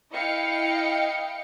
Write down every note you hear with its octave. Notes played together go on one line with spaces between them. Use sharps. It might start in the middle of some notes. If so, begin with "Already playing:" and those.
E4 D#5 F5 G5 C#7